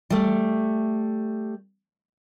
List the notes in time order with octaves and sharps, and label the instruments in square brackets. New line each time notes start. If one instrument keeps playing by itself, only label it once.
[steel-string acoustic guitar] G3 A3